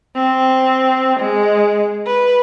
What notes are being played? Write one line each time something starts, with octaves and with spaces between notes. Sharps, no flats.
C4
G#3
B4